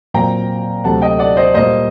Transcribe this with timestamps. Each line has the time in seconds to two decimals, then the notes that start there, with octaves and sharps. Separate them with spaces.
0.14 A#2 F#3 C4 G5 A#5
0.84 D2 C3 F#3 A3 C4 F#5 A5
1.02 D#5 G5
1.19 D5 F#5
1.37 C5 D#5
1.54 A#2 G3 A#3 C5 D#5